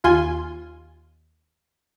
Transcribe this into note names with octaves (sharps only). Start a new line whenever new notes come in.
D#2 F4 G#5 C6